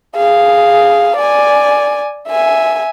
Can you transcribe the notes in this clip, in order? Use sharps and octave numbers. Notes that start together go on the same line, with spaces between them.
G#4 F5
D5 G#5
E5 G#5